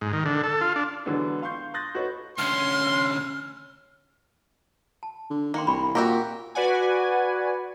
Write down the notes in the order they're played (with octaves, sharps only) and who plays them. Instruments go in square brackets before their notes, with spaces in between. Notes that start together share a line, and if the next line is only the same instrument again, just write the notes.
[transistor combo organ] G#2
D#3
D3
A4
F4
D4
[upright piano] D3 E3 F#3 G#3 B3 D4
F5 C6 C#6 G6 C7
C6 D#6 F#6 G6 A6 A#6
D#4 F#4 A4 B4 C#5
[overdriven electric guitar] D2 C#4 [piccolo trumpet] C6 [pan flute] F6
[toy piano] A5
[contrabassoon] D3
[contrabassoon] D#3 [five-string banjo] A#3 [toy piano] C5 G5 C6
[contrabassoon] C2 [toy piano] D4 B5 C#6
[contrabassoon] A#2 [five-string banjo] F#4 G4 A#4 [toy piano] F5 C#6 E6
[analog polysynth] F#4 B4 D5 F#5 G#5